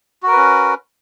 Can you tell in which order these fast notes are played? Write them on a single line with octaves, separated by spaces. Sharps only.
F#4 A#4 B4 C#4